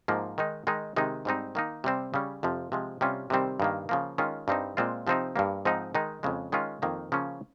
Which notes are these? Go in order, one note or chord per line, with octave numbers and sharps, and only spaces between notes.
G#2 F3 A#3
D#3 G#3 D#4
D#3 G#3 D#4
C3 D#3 G#3 D#4
G#2 G3 C4 D#4
D#3 A#3 D#4
C3 G3 C4
C#3 G3 C#4
F2 C3 F3
C3 F3 G#3
C3 G3 C#4 F4
C3 D#3 G3 C4
G2 D#3 A#3
C#3 F3 A#3
D#3 G#3 C#4 F4
G2 G3 C4 D#4
A#2 G#3 C4 F4
C3 F3 C4 D#4
G2 G3 A#3
G#2 F3 C4 D#4
D#3 G#3 D#4
F2 C#3 G#3
D#3 G#3 C#4 F4
F2 D#3 A#3 D#4
C#3 F3 A#3 C#4